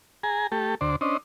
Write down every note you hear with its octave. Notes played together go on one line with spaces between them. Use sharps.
G#4 G#5 A#5
A3 G4 A4
D2 C5 D5
C#4 D4 C5 D#5